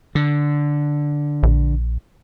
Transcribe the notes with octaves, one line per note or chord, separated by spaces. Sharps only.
D3
A#1